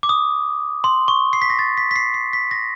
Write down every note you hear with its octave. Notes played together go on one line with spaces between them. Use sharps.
D6
D#6
C6
C#6
C7
B6
A#6
A6
B6
B6
C7
C7
B6
A#6